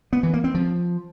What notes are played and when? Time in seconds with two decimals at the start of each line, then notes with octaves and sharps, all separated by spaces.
0.13 B3
0.23 E3
0.34 A#3
0.44 C4
0.54 F3